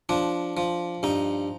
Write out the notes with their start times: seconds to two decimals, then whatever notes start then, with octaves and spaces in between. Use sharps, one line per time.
0.09 F3 D4
0.57 F3
1.03 G2 D#4